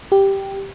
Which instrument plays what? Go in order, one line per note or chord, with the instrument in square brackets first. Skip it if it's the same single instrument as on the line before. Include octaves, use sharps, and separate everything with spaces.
[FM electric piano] G4